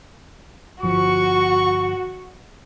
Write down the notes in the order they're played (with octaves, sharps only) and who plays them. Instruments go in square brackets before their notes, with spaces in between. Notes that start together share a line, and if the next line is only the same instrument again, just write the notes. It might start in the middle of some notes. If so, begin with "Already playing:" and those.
[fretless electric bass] G1 F3 [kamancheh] F#4 [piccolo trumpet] C#6